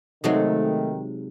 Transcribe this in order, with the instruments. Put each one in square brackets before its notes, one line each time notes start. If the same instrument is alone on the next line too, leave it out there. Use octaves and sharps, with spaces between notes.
[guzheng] C3 F#3 G#3 [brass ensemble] D#3 [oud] A3 C4 F#4 [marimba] D#4